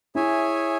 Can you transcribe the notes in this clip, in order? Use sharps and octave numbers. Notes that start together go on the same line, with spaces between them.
E4 G#4 C#5 E5 G#5